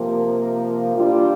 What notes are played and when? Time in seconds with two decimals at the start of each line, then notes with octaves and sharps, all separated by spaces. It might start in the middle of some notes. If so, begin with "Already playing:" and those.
Already playing: C3 F3 A#3
0.93 A#2 G3 D4 F4